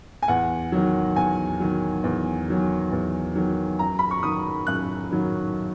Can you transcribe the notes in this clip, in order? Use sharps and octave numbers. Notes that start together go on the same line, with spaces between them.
G#5
E2 F#5
D#3 F#3
E2 G#5
D#3 F#3
E2
D#3 F#3
E2
D#3 F#3
F#2 A#5
B5
C#6
D#3 F#3 D#6
F#2 F#6
D#3 F#3